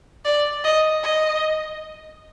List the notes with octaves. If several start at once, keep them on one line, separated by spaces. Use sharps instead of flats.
D5
D#5
D#5